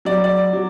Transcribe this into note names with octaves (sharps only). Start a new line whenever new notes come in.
F#3 D5
D5
F#3